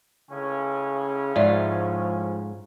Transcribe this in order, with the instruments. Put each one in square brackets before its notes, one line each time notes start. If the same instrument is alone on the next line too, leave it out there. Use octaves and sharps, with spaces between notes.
[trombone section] C#2 A2 C#4 [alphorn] C#3
[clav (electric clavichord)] G#2 F4 [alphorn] F3 [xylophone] D5 E5